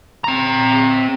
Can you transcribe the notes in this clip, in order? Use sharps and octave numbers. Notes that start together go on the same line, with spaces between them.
C4 A#5